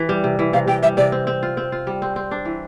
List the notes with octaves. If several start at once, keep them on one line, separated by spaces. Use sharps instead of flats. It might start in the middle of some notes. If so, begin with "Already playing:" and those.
Already playing: E3 G4
G3
C3
E3
C3 F5
C3 G5
G3 E5
C3 D5
C4
C4
F4
C4
F4
G3
C4
C4
D4
E3